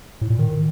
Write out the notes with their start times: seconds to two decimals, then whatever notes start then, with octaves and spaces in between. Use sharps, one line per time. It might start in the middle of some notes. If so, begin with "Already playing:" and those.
0.21 A2
0.30 A#2
0.39 D#3